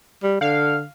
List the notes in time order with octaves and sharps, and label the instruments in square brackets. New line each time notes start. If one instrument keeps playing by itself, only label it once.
[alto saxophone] G3
[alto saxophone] D3 [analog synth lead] F5